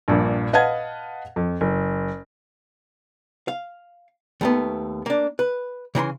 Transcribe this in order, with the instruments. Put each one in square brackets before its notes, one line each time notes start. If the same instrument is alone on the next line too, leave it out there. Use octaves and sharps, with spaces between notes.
[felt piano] A#1 G2 A#2
B4 D#5 F5 F#5 A5 G#6
F2
F#1
[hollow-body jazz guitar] F5
D#2 A3 B3
A#3 D4
B4
C#3 E3 B5 C6